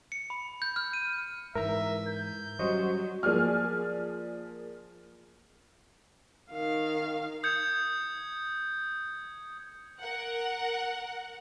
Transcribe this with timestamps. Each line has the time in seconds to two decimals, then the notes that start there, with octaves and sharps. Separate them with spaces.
0.12 C#7
0.30 B5
0.62 G6
0.76 F6
0.93 D#7
1.55 G#2 E3 A#4 E5 A#5
2.09 G6
2.59 F#3 G3 C#4 C5 D#5 C#6
3.23 F3 A#3 G#4 D5 G#5 F6
6.52 D#3 F5
7.43 D#6 G6 G#6 C#7
10.01 A#4 F#5